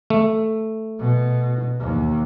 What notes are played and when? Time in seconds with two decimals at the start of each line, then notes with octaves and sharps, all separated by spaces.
0.10 A3
1.00 B2
1.81 D#2